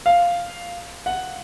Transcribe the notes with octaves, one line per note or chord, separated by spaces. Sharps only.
F5
F#5